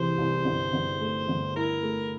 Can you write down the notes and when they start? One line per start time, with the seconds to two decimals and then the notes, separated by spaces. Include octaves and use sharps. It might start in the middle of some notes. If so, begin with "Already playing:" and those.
Already playing: C2 C3 E3 C5
0.18 C2
0.45 G1
0.73 G1
1.00 A3
1.28 G1
1.56 E4 A#4
1.83 A3